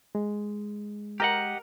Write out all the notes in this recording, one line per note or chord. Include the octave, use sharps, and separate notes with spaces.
G#3
G4 A#4 D#5 F#5